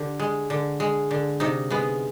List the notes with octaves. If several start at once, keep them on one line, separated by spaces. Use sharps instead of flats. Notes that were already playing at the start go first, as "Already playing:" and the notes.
Already playing: D3 G4
G#3
D3
G#3
D3
C3 D#4
G#3 B3